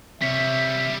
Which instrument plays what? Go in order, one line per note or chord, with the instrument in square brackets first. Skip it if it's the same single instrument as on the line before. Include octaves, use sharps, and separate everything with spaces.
[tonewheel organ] C3 [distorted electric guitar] G3 C#5 [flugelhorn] E5 [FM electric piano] B6